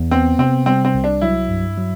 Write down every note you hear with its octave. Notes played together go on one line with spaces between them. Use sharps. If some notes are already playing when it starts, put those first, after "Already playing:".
Already playing: E2
B3 C4
C3 C4
G3 C4
C4
C2
D4
F#3 E4
G2
F#3